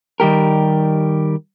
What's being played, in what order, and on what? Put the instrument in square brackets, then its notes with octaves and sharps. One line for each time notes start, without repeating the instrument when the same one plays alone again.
[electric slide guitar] D#3 G3 G4 A#4